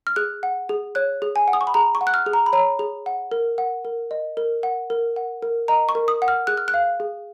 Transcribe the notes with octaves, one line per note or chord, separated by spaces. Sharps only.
F6
G#4 F#6
F#5
G#4
C#5 F#6
G#4
G#5
F#5
D#6
C#6
B5
G#4 A#5
C#6
F#5
F#6
F6
G#4
A#5
B5
C#5 A#5
G#4
F#5
A#4
F#5
A#4
D#5
A#4
F#5
A#4
F#5
A#4
D#5 A#5
C#6
A#4
D#6
F#5
F6
G#4 F#6
F6
F#6
F5
G#4